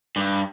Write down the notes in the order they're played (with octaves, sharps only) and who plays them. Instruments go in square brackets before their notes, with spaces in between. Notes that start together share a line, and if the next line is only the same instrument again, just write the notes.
[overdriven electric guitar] G2